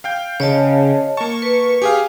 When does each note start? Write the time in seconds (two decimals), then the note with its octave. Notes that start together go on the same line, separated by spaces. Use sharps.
0.04 F5 G5 G6
0.40 C#3 C#5 D#5 A5
1.17 A#3 A5 C#6
1.42 B4
1.82 G4 G#4 F5 G#5